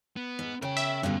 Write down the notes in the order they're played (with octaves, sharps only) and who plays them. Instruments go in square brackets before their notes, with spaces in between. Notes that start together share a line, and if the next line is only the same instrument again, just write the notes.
[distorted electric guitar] B3
[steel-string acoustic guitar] G#2
[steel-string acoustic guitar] C#3 [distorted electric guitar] A#4 G5
[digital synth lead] E5
[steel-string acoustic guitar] G2 B2 D3 [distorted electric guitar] C#4 C5